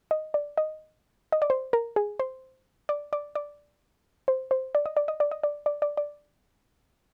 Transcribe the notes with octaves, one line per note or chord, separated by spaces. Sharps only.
D#5
D5
D#5
D#5
D5
C5
A#4
G#4
C5
D5
D5
D5
C5
C5
D5
D#5
D5
D#5
D5
D#5
D5
D5
D5
D5